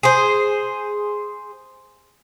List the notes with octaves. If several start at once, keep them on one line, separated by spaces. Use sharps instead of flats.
G#4 C5